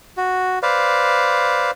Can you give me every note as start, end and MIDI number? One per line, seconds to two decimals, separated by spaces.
0.17 0.59 66
0.63 1.71 71
0.63 1.71 72
0.63 1.71 74
0.63 1.71 77